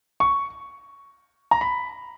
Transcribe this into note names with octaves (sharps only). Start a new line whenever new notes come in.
C#6
A#5
B5